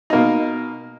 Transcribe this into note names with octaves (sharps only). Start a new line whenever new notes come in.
B2 A#3 D#4